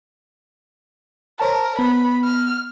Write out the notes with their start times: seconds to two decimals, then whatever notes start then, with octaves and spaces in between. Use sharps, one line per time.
1.40 A#4 C5 C#5 A5
1.79 B3 B5
2.24 F6